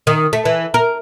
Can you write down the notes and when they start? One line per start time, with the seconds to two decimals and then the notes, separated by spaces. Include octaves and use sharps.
0.07 D#3
0.33 A3
0.45 E3
0.74 A#4